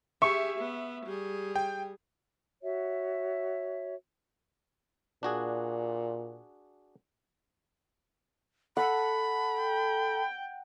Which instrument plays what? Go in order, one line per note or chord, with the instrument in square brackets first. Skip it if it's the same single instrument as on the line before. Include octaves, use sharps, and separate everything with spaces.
[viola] G4 G#4 [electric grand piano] E5 [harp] C#6
[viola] B3
G3 G#4
[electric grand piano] G5
[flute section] F#4 C#5 E5
[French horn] A#2 [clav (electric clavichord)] D4 F#4 G#4
[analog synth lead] A4 [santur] F#5 [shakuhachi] B5
[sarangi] G5